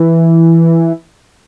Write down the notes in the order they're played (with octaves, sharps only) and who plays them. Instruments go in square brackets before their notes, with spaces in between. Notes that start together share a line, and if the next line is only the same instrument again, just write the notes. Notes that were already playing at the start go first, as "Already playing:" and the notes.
Already playing: [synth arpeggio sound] E3